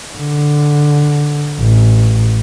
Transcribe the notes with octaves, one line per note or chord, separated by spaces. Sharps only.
D3
A1